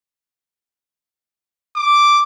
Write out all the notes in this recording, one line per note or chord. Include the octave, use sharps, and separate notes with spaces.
D6